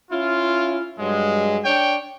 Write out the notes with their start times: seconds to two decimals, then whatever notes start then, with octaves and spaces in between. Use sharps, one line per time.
0.11 C#4 E4 F4
0.99 G2 F#3 G#3
1.65 D4 C#5 G5